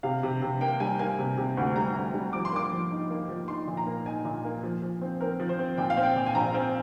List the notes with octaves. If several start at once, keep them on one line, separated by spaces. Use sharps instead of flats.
C3 F5
C3
C3
A#3 G5
G3 G#5
A#3 G#5
C3
C3
D2
G3 A#5
D2
G3
F3 D6
C6
A#3 D6
F3
D#4
A#3
F3
D#4 C6
A#2
A#5
A#3
D#4 G#5
A#2
A#3
F3
F3
C4
C4 A#4
F3
C5
C4
A#2 G5
F5
C4
G5
A#2
G#5
A#1 A#5
C4